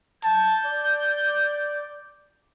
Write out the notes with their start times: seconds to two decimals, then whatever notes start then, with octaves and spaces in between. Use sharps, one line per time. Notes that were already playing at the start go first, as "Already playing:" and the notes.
0.24 A5 G6
0.66 D5